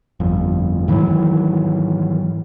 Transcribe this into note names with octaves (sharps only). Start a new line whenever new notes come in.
G1 F2
G#2 D#3 E3 F#3